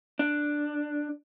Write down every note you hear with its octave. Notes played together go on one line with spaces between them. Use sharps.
D4